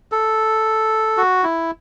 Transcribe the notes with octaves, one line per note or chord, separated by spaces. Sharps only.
A4
F#4
E4